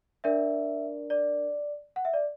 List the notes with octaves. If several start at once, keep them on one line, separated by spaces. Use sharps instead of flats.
D4 A#4 D5 E5
D5
F#5
E5
D5